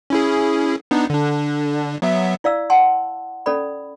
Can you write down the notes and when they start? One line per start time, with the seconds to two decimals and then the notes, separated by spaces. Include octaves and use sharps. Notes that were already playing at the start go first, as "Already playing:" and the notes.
0.10 C#4 E4 G#4
0.91 B3 D4 D#4
1.10 D3 D4
2.02 F#3 B3 E5
2.44 E4 D5 F5 E6
2.70 F#5 G#5 A5 C6
3.46 C#4 A4 D5 B5